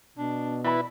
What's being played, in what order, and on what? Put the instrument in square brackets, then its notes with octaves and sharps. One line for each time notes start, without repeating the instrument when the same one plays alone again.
[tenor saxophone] B2 [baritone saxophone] D4
[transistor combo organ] E4 B4 [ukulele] D5 B5